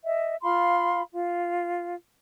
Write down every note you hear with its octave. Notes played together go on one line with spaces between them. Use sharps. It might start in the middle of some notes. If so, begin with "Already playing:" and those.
D#5 E5
F4 F5 B5 C6
F4